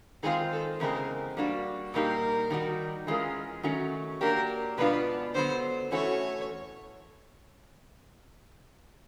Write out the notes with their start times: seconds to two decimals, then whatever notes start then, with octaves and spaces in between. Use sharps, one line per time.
0.23 D#3 G#3 C4 F4 G#4
0.52 A4
0.80 E2 C#3 G#3 C4 A#4
1.37 G3 A#3 D4 F#4
1.93 A#2 G3 A#3 D#4 G4 A#4
2.50 D#3 G3 C4 D#4 F#4
3.07 E3 G#3 C#4 F4 A#4
3.63 D#3 F#3 A3 C#4 F#4
4.21 F#3 A#3 D4 G4 A#4
4.78 B2 G#3 B3 D4 F4 B4
5.34 D3 F#3 B3 C5
5.91 E3 A3 C#4 F#4 A4 C#5